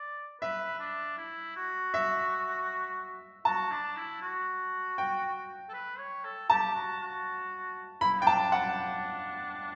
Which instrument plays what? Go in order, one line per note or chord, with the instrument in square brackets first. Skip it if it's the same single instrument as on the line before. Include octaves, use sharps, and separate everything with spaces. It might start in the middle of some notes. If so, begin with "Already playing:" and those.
Already playing: [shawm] D5
[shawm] B4 [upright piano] E5
[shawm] D4
E4
F#4
[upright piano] E5
[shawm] F#4 [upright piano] A5
[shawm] D4
E4
F#4
[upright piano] G5
[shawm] A4
B4
C#5
A4
[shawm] G4 [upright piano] A5
[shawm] F#4
F#4
[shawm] E4 [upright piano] B5
[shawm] D4 [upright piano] G5
[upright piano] A5
[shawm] D4
[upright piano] F#5
[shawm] D4